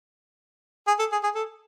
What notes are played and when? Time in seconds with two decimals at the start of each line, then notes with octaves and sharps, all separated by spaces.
0.87 G#4
0.99 A4
1.12 G#4
1.24 G#4
1.35 A4